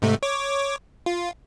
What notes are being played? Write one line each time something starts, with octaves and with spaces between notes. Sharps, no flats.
G#2 C3 A3
C#5 D6
F4